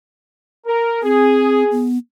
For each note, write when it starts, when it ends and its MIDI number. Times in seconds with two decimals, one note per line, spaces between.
0.66 1.00 70
1.03 1.63 60
1.03 1.87 68
1.71 1.98 59